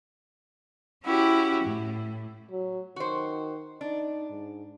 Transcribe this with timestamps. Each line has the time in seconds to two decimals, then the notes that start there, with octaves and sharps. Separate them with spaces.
1.04 C#4 E4 F#4 G4
1.64 A2
2.51 F#3
2.96 D#3 F#4 C5
3.81 D4 D#4
4.30 G#2